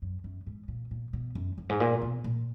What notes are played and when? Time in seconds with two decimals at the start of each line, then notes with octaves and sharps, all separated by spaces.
0.02 F#2
0.24 F#2
0.46 G#2
0.68 A#2
0.91 A#2
1.13 B2
1.35 F#2
1.58 F#2
1.69 G#2
1.80 A#2
2.02 B2
2.24 A#2